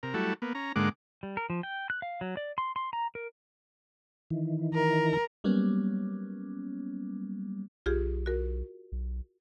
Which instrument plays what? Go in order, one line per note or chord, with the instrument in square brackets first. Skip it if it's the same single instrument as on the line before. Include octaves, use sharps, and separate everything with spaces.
[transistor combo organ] C3 A#4
F#3 G3 A3 E4 F#4 A4
A#3 B3
C#4 A#5
G#2 D3 G#3 A#3 F#5 D6
[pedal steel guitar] G3
A#4
F3
G5
F#6
F5
F#3
D5
C6
C6
A#5
A#4
[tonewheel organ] D#3 E3
[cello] A#4
[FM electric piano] F#3 G3 A#3 B3 C#4
[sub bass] B1 [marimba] F4 G4 G#4
[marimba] F#4 A#4
[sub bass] B1